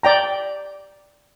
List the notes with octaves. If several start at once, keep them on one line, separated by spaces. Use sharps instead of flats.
D5 G5 A#5